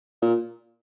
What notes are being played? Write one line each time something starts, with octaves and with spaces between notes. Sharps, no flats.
A#2